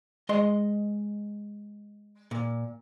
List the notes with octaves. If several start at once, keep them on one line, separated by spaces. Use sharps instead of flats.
G#3 D#5 C6
A#2